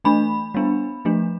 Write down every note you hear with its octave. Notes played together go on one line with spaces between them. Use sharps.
E3 A3 D4 B5
G3 B3 D4
F3 A3 D4